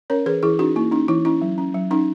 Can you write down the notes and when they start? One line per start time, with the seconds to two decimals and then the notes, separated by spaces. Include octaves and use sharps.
0.10 C#4 A#4 C#5
0.26 E3 G#4 B4
0.43 E3 E4 G#4
0.59 C#4 D#4 F#4
0.76 A#3 E4
0.91 C#4 D#4
1.08 E3 E4
1.25 C#4 E4
1.42 F#3
1.58 C#4
1.74 F#3
1.91 C#4 D#4